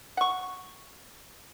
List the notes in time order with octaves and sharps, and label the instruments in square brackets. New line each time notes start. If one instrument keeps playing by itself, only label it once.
[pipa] F#5 C#6